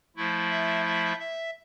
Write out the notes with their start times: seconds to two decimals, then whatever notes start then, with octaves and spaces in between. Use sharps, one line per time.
0.16 F3 A3 E4
0.51 E5
0.85 E5
1.20 E5